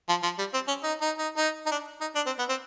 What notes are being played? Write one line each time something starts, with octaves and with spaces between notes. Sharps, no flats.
F3
F3
G3
C4
C#4
D#4
D#4
D#4
D#4
D#4
D4
D#4
D4
C4
B3
C4